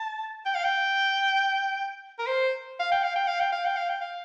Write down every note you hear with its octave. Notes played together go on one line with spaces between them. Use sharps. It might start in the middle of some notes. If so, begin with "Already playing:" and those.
Already playing: A5
G5
F5
G5
A#4
C5
F5
G5
F5
G5
F5
G5
F5
G5
F5
G5
F5